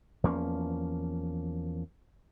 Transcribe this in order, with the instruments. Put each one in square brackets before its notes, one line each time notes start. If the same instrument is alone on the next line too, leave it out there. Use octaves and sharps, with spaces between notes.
[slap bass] E2 F3 A#3 C#4